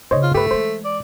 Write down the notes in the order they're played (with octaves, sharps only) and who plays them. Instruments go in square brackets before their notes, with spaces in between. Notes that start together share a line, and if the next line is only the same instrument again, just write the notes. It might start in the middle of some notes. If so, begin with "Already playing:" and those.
[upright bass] C#3 D#4 [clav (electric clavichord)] C5 C#5 D#5
[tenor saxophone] F4
[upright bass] G2 [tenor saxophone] A3 [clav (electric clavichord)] G4 B4
[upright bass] E3 G#3 [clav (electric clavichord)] C5
[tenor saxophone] D5